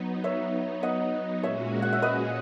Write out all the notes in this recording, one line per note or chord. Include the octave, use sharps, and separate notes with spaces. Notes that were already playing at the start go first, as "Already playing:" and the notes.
Already playing: F#3 B3 D#4
C#5 E5
D#5 F#5
A#2 G#3 C#4 F#4 C#5 E5
F#5
E5
B4 D#5